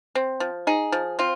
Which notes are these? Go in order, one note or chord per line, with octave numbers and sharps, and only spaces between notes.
C4
F3
D#4 G#4
F3
C4 F4